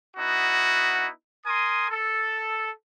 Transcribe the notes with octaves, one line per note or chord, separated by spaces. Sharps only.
B3 D#4 E4 F#4
A#4 G#5 C6 D#6
A4